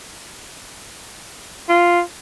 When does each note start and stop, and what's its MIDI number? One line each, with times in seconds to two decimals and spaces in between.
1.69 2.01 65